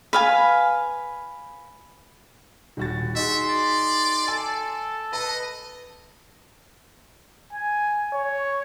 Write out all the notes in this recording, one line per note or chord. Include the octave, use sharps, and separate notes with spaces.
B4 F5 G#5
D#1 F#4 A6
D#4 F#4 G#4 E5 C6
D5
A4 G#5
B4 D#5 A5
G#5
C#5